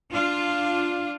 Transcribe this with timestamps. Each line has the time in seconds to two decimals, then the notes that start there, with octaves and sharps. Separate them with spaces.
0.12 D4 F4